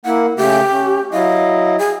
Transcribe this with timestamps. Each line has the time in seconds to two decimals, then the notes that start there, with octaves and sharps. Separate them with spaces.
0.05 A#3 E4 F#5
0.37 C#3 A3 G4
0.71 C#4
1.13 F#3 E4 D#5 F5
1.79 G#4